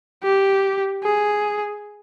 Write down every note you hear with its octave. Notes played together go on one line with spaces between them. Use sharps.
G4
G#4